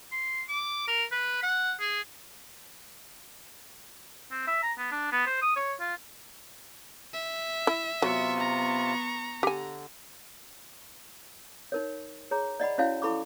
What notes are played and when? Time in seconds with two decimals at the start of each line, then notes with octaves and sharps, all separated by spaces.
0.12 C6
0.49 D6
0.88 A#4
1.12 B4
1.43 F#5
1.80 G#4
4.31 C4
4.48 E5
4.63 A#5
4.78 B3
4.92 D4
5.12 B3
5.27 C5
5.42 D#6
5.56 C#5
5.80 F4
7.13 E5
7.67 E4
8.02 C3 F#3 B3 F4 C#6
8.40 A#5
9.43 D3 G4 G#5
11.72 D#4 A#4 C#5
12.31 G#4 C#5 A#5
12.60 D5 D#5 F#5 B5
12.78 C#4 E4 F#4 C#5 F5 G#5
13.02 E4 A4 B5 C#6 D6